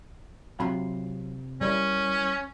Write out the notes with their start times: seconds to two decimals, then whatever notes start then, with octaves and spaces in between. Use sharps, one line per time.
0.60 C3 F#3 F4 B5
1.61 G3 C#4 E4 A#4 D5